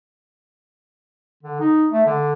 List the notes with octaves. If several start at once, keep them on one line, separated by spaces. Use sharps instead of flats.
D3
D#4
A3
D3